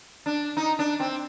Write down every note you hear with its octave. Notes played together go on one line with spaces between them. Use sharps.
D4
D#4
D4
C4